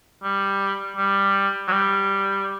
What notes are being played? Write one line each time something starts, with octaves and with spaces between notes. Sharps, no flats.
G3
G3
F#3
G3